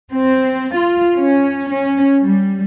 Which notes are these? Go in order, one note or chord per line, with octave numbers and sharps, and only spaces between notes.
C4
F4
C#4
C#4
G3